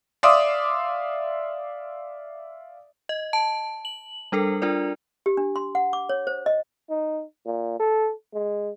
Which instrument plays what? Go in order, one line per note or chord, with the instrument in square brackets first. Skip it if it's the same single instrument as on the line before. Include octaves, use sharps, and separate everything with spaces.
[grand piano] D5 E5 F5 C6 D6 D#6
[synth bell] D#5
A5
F#7
G3 D4 A4 A#4
D4 F4 A#4 D5
[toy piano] G4
D4
C6
F#5
D6
C#5
C5
D#5
[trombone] D#4
A#2
A4
G#3